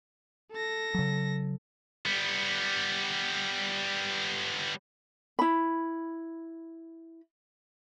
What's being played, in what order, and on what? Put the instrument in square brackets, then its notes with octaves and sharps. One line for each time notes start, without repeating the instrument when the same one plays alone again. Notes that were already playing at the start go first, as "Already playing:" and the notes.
[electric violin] A4 A#6
[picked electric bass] C#3 F#3
[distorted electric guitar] G3 B3
[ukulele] E4 B5